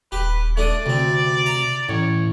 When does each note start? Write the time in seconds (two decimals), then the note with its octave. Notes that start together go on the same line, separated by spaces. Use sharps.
0.12 D#1 G4 B4
0.57 A3 D4 D5 D#6
0.86 D2 C3 C4
1.46 A#5
1.89 A1 A2 C#5